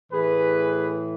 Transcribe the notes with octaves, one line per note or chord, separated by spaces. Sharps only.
A2 E3 G#4 B4